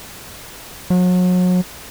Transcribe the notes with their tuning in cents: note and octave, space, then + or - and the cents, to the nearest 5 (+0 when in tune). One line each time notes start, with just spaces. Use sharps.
F#3 -35